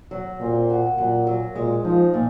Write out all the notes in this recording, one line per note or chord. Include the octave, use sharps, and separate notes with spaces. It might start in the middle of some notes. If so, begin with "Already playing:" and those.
F#3
A#2 C4
F#4
A#2 F#3
F#3
A#2 G#3
F3 D#4
A#2